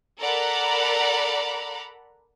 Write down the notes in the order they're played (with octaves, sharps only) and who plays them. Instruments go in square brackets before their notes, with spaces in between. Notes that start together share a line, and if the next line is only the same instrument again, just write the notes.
[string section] A4 A#4 D5 F#5 A#5 B5